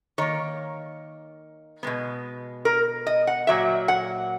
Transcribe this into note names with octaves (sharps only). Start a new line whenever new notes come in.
D#3 A#3 C#5
B2 G#3 B3
A#4
D#5
F#5
A#2 F#3 A#3 E5
F#5